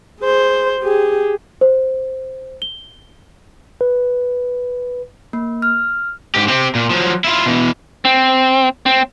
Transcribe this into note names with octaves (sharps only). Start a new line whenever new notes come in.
G#4 C5
G4 G#4
C5
G7
B4
A#3
F6
G#2 G4
C4 G4
A#2
F3 F#3
E4 F4
B2 E3
C4
C4